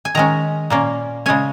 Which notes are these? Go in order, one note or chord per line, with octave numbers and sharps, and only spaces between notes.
G#5
D#3 G#3 C#4 A#5
A#2 A#3 C#4
C#3 G#3 C#4 G#5